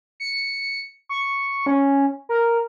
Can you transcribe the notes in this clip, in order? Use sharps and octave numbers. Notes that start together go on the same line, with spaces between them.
C#7
C#6
C#4
A#4